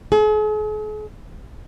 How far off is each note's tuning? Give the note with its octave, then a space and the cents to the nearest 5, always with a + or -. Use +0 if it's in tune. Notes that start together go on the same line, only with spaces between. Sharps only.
G#4 +45